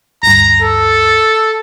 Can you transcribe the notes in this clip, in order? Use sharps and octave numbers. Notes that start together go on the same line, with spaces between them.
D2 G2 A#5
A4